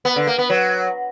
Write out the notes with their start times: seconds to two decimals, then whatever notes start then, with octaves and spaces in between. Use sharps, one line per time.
0.05 B3
0.16 D3
0.27 A#3
0.38 B3
0.50 F#3